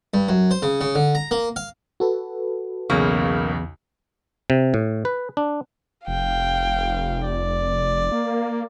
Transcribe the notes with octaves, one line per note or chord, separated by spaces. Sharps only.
G2
F#2
C5
C#3
C#3
D3
A#5
A#3
F5
F#4 A4 B4
B1 E2 C#3 A#3 C#6
C3
A2
B4
D4
F1 F5 G5
D5
A#3